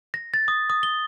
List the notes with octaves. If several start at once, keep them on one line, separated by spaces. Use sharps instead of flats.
A#6
A6
D#6
D#6
G7